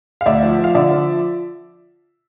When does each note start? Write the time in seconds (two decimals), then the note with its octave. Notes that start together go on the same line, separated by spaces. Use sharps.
0.21 F5
0.26 D2 D5 E5
0.43 F3
0.59 F3
0.64 F5
0.75 D3 D5 E5
0.91 F3